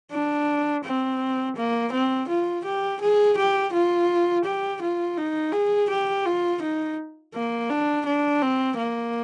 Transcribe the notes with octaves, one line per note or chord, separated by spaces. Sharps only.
D4
C4
A#3
C4
F4
G4
G#4
G4
F4
G4
F4
D#4
G#4
G4
F4
D#4
A#3
D4
D4
C4
A#3